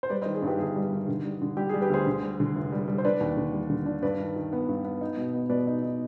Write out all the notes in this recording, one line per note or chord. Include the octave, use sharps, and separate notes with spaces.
C5
G3 B4 D5
D#3 C5 D#5
G#4
G2 G4 B4
G1 G#4
G3
D#3
D3
G3
D3
G3 G4
G#4
G3
G4 B4
D2 G#4 C5
D3
G3
D3
F1
G3
G3
C5
D4 B4 D5
D#2
D3
G3
D3
D4
G2 B4 D5
D#3
D#3
B3
G2
B3
D#4
B2
B3
B2 B4 D5
D#4
D#4